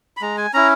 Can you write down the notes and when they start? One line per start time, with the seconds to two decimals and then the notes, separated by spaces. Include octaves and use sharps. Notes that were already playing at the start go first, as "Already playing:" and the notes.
0.17 B5
0.22 G#3 A#5
0.38 G#5
0.54 C#4 E4 A#5